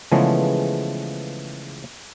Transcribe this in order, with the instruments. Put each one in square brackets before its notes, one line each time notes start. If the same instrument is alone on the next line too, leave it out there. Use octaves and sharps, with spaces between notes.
[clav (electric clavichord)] C#3 E3 F3 G#3 A3 B3